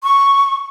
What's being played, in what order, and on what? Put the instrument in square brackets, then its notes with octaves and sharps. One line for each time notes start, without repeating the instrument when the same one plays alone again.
[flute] C#6